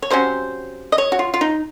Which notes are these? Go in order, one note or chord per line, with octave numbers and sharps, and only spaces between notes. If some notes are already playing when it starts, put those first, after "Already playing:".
C#5
C3 F#3 C#4 C5
D#5
C#5
F#4
F4
F4
D#4